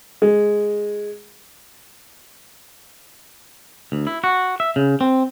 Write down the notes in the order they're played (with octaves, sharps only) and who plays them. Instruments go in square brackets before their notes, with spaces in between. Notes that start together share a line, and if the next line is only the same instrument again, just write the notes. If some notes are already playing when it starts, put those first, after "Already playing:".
[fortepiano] G#3
[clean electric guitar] D2
E4
F#4
E5
C#3
C4